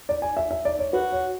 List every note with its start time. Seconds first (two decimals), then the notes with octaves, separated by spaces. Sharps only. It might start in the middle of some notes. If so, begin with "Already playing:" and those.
0.09 D5
0.22 G#5
0.37 E5
0.51 E5
0.65 D5
0.79 C#5
0.93 F#4 B4
1.12 C#5